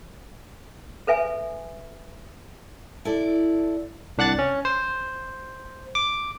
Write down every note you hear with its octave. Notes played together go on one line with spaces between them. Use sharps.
A4 B4 E5 G#5
E4 A4 D5
C2 D4 F#5 F#6 A6
C#4
C5
D6